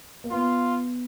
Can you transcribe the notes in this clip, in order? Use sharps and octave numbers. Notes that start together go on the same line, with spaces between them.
A#3
B3 F4